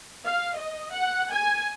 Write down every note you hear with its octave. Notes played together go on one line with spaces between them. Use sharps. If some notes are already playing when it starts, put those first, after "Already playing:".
F5
D#5
F#5
G#5